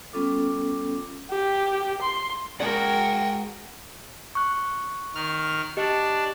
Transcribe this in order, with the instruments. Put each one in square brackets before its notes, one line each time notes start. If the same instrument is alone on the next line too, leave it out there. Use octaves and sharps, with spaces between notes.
[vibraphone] G3 B3 C#4 F4 A4 D6
[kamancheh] G4
C6
[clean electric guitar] G#2 G#4 D5 [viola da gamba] F#4 A#4 [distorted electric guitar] F#5 G5
[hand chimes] C#6 F#6
[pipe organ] D#3 F6
[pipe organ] D4 [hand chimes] G4 D#5